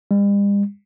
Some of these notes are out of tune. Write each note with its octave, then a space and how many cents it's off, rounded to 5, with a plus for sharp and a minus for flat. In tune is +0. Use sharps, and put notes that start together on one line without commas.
G3 +45